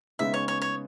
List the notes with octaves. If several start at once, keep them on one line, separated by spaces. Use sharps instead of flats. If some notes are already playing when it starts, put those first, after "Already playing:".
C#3 G#3 B3 D#4 E5
C#5
C#5
C#5